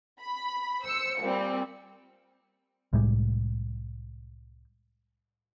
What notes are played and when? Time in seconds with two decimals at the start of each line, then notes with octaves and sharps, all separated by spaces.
0.20 B5
0.84 C5 E6 C#7
1.20 A#2 G3 C4
2.93 C2 A2 G3 G#3